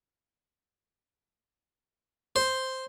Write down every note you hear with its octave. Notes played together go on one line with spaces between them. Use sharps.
C5